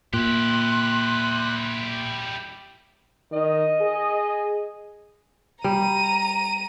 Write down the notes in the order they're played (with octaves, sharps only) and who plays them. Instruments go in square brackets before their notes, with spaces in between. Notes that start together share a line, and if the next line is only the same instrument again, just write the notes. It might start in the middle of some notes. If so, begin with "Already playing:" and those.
[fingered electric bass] A#2 [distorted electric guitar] E4 G4 [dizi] C6 [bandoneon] F#6
[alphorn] D#3 [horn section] D#5
[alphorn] G#4
[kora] G3 [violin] A#5 D#7